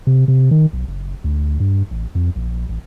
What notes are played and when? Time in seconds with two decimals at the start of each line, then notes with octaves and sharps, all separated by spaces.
0.07 C3
0.28 C3
0.51 D#3
0.73 B1
0.88 F#1
1.24 D2
1.60 G2
1.91 A1
2.15 F2
2.36 A#1
2.69 A1